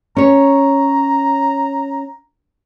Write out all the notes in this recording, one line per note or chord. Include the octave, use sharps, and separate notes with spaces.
C#4 C#5 A#5